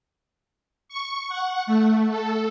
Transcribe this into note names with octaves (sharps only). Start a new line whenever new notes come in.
C#6
F#5
A3
A4